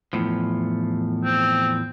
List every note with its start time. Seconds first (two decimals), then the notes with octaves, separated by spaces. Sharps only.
0.13 E2 A2 F3
1.25 C4